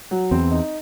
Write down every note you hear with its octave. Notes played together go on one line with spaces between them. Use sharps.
F#3
E2 C4
D#4